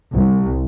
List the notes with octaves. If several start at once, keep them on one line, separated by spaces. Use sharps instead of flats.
C2